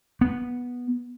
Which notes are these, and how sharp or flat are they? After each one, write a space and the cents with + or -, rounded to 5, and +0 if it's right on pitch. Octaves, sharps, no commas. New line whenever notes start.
B3 -10